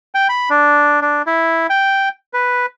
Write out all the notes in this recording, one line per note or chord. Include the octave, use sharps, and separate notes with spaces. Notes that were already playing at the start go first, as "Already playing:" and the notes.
G5
B5
D4
D4
E4
G5
B4